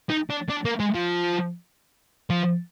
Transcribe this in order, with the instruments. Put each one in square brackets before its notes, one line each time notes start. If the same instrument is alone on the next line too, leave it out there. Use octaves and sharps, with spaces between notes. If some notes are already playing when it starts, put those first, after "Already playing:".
[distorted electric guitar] D#4
D4
D4
A#3
G#3
F3
F3